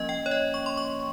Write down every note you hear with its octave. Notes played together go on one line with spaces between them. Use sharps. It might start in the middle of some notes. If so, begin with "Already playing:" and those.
Already playing: F3 A#3 C#4 D#5
G5
C#5
D#5
C#6
C6
C#6